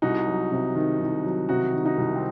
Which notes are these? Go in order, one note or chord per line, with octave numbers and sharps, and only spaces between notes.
C2 D#4 F#4
F#3
C3
D#3
C2
F#3
C3 D#4 F#4
D#3
D#4 F#4
C2
C4